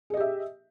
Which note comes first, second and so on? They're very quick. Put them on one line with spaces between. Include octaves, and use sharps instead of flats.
G#4 D#5 G4 E5